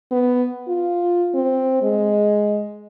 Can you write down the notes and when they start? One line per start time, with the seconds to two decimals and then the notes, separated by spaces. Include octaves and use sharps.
0.11 B3
0.68 F4
1.34 C4
1.82 G#3